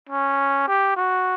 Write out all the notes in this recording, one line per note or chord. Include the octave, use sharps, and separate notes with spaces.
C#4
G4
F#4